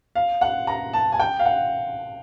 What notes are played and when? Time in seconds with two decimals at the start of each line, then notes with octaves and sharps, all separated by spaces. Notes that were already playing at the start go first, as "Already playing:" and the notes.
0.15 F5
0.41 F#5
0.67 A#5
0.93 A5
1.12 G#5
1.19 G5
1.39 F5
1.45 F#5